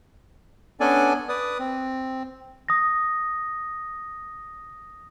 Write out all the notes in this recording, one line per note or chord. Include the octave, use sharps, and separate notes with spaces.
B3 C#4 D4 A4 D5 G#5
B4 D5 D#6
C4
D#6 A#6